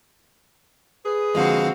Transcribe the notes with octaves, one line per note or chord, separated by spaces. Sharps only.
G#4 B4
D3 F3 G#3 C4 F#4 F5